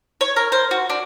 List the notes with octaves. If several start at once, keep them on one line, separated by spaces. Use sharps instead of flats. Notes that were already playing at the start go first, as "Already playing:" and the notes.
C#5
A#4
C5
F#4
D4